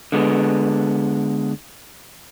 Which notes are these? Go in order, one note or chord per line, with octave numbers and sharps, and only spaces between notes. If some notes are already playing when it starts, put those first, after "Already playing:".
D3 G#3 B3